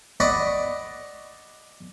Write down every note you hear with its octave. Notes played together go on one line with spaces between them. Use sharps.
D5 D#5 F#5 B5 C#6